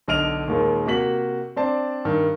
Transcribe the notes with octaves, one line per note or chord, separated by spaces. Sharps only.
B1 D3 D#5 F6 D7 F7
D#2 A#2 D#3 G#3 A#3
C3 A#3 F#4 B6 F#7
C4 D4 C5 D5 A5
G2 D#3